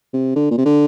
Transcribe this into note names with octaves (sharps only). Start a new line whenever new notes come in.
C3
D3
A#2
C3
D3